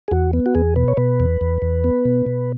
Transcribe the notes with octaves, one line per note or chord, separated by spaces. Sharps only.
G#4
E2 F#4
B3
F#4
E2 G#4
B2 B4
C#5
B2 B4
E2
E2
E2
B3
B2
B2